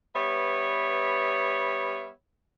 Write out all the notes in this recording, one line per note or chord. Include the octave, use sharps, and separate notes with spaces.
G3 B3 B4 C#5 E5